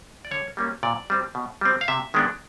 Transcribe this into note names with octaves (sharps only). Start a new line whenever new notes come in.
D5
D3 C#5
G3 A#3 C#4
A#2 D5
G3 C4
B2
G3 C4
F5
C3 E5
D#3 G#3 B3 D4